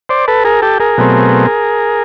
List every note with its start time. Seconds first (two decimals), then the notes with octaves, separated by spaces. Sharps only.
0.09 C5 D5
0.28 A4 B4
0.45 G#4 A#4
0.62 G4 A4
0.80 G#4 A#4
0.98 B2 F#3 A3 C4